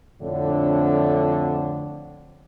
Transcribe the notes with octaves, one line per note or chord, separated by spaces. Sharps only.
F2 A2 D3